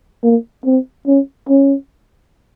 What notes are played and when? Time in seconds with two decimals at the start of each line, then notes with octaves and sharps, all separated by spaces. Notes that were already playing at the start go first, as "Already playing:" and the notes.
0.23 A#3
0.65 C4
1.07 C#4
1.49 C#4